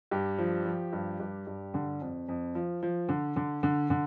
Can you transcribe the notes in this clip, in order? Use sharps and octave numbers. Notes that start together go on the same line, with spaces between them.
G2 G4
F3
F3
G2
G2
G2
D3
F2
F2
F3
F3
D3
D3
D3
D3